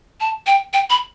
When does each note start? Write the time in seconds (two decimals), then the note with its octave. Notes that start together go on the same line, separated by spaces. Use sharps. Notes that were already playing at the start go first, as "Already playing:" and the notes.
0.21 A5
0.47 G5
0.73 G5
0.90 B5